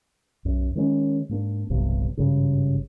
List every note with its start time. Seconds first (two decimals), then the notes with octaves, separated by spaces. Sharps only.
0.45 B1 F#2
0.75 D#3 G#3 C4 C#4
1.29 G#2 A#3 D4
1.70 D1 B1 G2 C3
2.17 G#1 G2 C#3